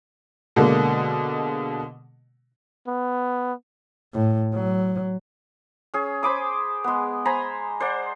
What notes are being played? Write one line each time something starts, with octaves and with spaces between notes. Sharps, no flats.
B2 D3 G#3 A#3
B3
A2
F#3
C#4 G#4
C5 B5 D6 D#6
G#3 B3
C5 G#5 A#5 B5
C5 D5 F#5